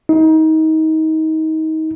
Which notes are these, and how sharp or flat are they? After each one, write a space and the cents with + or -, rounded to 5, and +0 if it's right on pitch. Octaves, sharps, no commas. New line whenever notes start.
D#4 +25